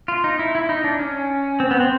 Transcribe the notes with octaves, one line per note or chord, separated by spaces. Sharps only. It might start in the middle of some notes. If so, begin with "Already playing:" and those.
F4
D#4
E4
E4
D#4
D4
C#4
C4
B3
C4